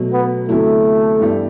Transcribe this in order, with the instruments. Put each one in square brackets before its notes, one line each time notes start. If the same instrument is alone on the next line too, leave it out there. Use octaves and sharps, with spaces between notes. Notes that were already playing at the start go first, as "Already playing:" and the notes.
Already playing: [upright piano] B2 F#3 A3
[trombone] B3
[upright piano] D2 C3 F#3 B3 E4 [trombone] A3
[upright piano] G2 E3 G3 B3